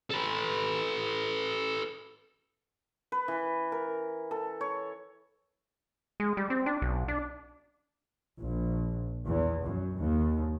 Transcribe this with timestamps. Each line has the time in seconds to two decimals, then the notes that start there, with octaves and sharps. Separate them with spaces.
0.11 A4 B4
3.12 B4
3.28 E3
3.72 A#4
4.31 A4
4.61 C#5
6.20 G#3
6.37 G3
6.50 C4
6.66 D4
6.82 B1
7.08 D4
8.39 A#1
9.25 E2
9.63 F#2
9.98 D#2